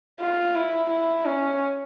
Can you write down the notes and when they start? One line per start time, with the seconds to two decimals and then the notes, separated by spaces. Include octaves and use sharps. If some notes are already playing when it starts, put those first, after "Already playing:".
0.20 F4
0.55 E4
0.90 E4
1.25 C#4